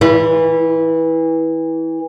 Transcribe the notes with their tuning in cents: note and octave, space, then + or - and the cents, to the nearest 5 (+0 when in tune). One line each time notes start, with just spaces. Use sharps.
E3 -20 E4 +40